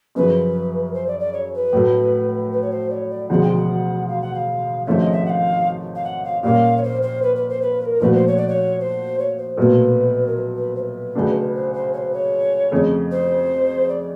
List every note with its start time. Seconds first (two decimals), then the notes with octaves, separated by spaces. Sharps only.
0.15 F#2 C#3 F3 B4
0.93 C5
1.07 D5
1.20 D5
1.33 C#5
1.53 B4
1.73 A2 F#3 A3
2.52 B4
2.62 C#5
2.71 C5
2.90 D5
2.94 C#5
3.10 D5
3.29 E1 D2 C#3 F3 G#3 F#5
3.43 G5
3.56 F#5
4.08 F5
4.21 F#5
4.34 F5
4.86 G#1 G#2 F3 A3 C#4 E5
5.00 D#5
5.12 E5
5.25 F#5
5.30 F5
5.95 F5
6.04 F#5
6.24 F5
6.43 A#2 G3 A#3 C#4 F5
6.77 C#5
6.83 C5
7.02 C5
7.22 B4
7.36 B4
7.49 C5
7.62 B4
7.81 B4
7.85 A#4
8.00 A#2 F3 A3 D4 F#4 B4
8.14 C5
8.27 C#5
8.37 D5
8.48 C#5
8.80 C5
9.19 C#5
9.37 C5
9.57 B1 A#2 F#3 A3 B4
10.26 A#4
10.36 B4
10.56 B4
10.76 C5
10.79 B4
11.15 C#2 C#3 F#3 A3 D4
11.54 C5
11.73 C5
11.93 C#5
11.98 C5
12.13 C#5
12.71 F2 C#3 F3 A3
13.11 C5
13.89 D5